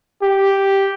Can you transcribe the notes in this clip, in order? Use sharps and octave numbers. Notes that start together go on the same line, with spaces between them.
G4